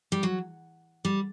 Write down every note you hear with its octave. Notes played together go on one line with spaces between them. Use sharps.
G3
F#3
G3